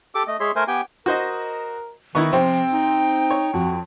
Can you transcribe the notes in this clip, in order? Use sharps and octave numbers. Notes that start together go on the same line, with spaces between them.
G4 A4 D6
A3 D#5
G#3 G#4 C#5 E5 C6
A3 A#4 C5 G#5
B3 G4 G5 G#5
F#4 A#4 C5 D#5
D#3 B3 D#4 E4 C#6
C3 F3 C4 G5
D#4
C#5
F2 F#4